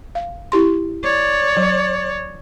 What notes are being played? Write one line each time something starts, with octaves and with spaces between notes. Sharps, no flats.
F5
E4 G4 C6
C#5 D5
F#3